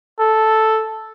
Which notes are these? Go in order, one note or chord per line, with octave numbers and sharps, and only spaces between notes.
A4